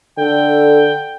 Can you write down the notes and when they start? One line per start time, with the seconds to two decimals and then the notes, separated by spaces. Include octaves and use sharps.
0.18 D3 A4 G5